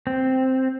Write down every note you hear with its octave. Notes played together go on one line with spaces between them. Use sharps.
C4